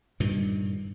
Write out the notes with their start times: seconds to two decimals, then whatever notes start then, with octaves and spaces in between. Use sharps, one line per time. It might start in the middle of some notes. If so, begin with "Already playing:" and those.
0.20 G2 A#2 D#3